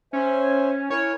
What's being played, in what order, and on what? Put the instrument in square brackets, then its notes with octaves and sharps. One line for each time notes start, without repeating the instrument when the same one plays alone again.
[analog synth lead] C#4 [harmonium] C5 E5 G#5
[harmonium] E4 A#4 G#5 [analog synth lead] C#5